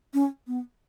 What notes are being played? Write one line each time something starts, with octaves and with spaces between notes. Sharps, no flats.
C#4
B3